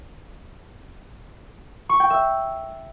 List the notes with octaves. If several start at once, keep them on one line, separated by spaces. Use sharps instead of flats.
C#6
G5
E5